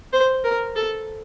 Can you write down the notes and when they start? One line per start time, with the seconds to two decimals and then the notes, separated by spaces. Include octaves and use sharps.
0.13 C5
0.44 A#4
0.76 A4